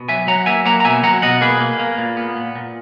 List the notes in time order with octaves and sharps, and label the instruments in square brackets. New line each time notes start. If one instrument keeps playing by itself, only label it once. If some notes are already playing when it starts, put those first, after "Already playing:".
Already playing: [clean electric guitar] B2
F#3 E5 G#5
F#3 F#5 A#5
A#3 E5 G#5
A#3 F#5 A#5
A#5
B2 E5 G#5
F#3 F#5 A#5
B2 D#5 F#5
A#3 G#4 B4
A#3
A#3
A#2
B3
A#2
A#2